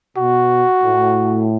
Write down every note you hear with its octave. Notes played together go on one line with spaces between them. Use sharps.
B2 F#4
A2